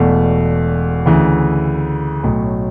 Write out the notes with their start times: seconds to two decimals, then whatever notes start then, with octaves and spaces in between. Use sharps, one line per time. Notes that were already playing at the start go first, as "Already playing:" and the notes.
Already playing: E1 E2 B2 A3
1.06 D2 C#3 E3
2.23 B1 A2 F#3